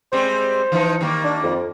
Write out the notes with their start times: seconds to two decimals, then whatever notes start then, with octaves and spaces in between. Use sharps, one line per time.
0.13 G3 G#3 C4 C5
0.72 E3 F3 D#4
1.01 D#3 G3 A#3
1.24 D4
1.43 F2